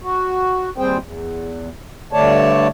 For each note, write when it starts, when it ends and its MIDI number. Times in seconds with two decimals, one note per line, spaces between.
0.02 0.70 66
0.78 0.97 39
0.78 0.97 55
0.78 0.97 60
0.78 0.97 68
0.78 0.97 72
0.78 0.97 79
0.99 1.69 40
2.13 2.67 43
2.13 2.67 50
2.13 2.67 57
2.13 2.67 73
2.13 2.67 74
2.13 2.67 81